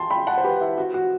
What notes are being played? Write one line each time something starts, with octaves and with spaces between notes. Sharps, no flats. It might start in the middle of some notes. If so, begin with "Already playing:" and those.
Already playing: G5 A5 C6
G5 B5
F#5 A5
C5
G4 B4
E4
F#4
F#4